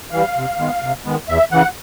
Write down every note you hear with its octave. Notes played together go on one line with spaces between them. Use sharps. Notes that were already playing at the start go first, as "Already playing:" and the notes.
E3 G3 F5
C3
D#3 G#3 B3
C3
D#3 G#3 B3
E2 E5
C#3 E3 F#5